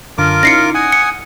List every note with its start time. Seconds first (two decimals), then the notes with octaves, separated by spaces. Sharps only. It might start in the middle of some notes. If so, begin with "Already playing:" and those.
0.18 F#2 D3 F4 A#4 D6
0.43 C#4 D#4 E4 A#6 C7 C#7
0.74 F#5 G#5 D#6
0.92 C#7